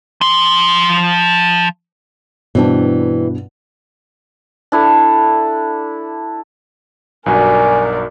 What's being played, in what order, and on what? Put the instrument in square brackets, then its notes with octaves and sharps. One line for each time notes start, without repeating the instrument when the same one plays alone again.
[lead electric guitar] F3 C6
[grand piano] G2 B2 [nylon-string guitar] E3 C4 D4
[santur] D4 E4 A4
[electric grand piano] B1 G2 F#4 [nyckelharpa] A#4 D5 [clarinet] G#5